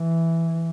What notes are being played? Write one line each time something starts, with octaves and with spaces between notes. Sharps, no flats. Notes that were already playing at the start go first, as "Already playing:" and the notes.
Already playing: E3